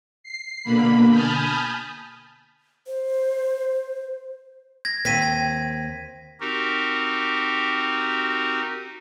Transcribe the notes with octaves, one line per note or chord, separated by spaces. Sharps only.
C7
B2 D3 A#3 B5
G#5 A5 B5 D#6 F6 G6
C5
G#6 A#6
D#2 C4 A#6 B6 D#7
G#6
C4 D#4 F#4 G4 A#4